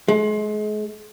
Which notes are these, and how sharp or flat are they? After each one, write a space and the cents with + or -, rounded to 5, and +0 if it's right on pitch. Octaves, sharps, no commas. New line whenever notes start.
G#3 +35